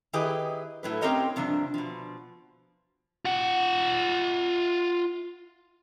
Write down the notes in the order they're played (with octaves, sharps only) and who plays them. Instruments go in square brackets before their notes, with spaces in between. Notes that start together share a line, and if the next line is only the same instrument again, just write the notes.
[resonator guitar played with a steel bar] D#3 E4 G4 G#4 B4 D#5
A2 F#3 B4
C4 C#4 G4 A#4 C#5 D#5
G2 C3 F3 D4
B2 F3
[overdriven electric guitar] F4 F#5